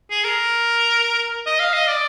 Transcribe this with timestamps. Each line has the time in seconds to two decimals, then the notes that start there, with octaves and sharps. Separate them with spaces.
0.11 G#4
0.24 A#4
1.46 D#5
1.60 F5
1.73 D#5
1.87 D5